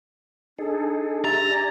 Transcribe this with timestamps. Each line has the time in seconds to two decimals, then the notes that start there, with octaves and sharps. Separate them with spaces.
0.59 D4 D#4 G#4 A4
1.24 G4 E5 A#5 A6
1.51 D5 G#5